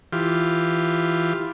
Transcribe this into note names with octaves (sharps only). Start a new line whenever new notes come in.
E3 F4 G4